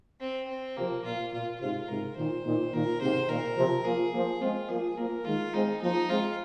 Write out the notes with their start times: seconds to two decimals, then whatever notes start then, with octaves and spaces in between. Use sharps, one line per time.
0.20 C4
0.48 C4
0.77 C3 F3 A#3
1.04 A#2 F4
1.32 A#2 F4
1.60 G#2 C3 F4
1.88 G#2 C3 A#4
2.16 A#2 D#3 C5
2.45 A#2 D#3
2.73 A#2 D#3 A#4
3.00 G#2 C3 C5
3.28 A#2 D#3 A#4
3.56 C3 F3
3.84 F3 A#3 G#4
4.12 F3 A#3
4.41 G#3 C4 F4
4.69 F3 A#3 G#4
4.97 F3 A#3 A#4
5.25 D#3 G#3 F4
5.53 G#3 C4 D#4
5.81 F3 A#3 D#4
6.09 G#3 C4 F4